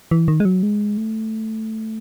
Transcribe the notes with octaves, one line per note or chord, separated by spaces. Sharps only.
E3
D#3
G#3
F#3
G#3
A3